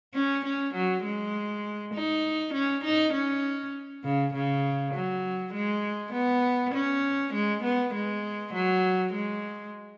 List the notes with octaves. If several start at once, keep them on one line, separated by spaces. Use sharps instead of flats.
C#4
C#4
F#3
G#3
D#4
C#4
D#4
C#4
C#3
C#3
F#3
G#3
B3
C#4
G#3
B3
G#3
F#3
G#3